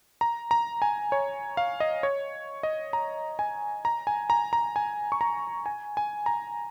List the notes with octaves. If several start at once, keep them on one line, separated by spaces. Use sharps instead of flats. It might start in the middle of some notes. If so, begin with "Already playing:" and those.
A#5
A#5
G#5
C#5
F5
D#5
C#5
D#5
A#5
G#5
A#5
G#5
A#5
A#5
G#5
C#6
A#5
G#5
G#5
A#5